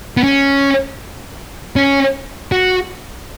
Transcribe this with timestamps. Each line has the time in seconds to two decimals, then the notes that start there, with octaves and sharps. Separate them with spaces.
0.17 B3
0.24 C#4
1.76 C#4
2.52 F#4